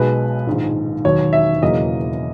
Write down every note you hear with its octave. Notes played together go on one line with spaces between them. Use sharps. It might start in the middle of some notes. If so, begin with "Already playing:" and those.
Already playing: B1 B2 G#3 B4
A#1 G#2 D#3
E1 D#2 D#3 F#3 C#5
E5
E1 E2 C#3 F#3 A#3 D#5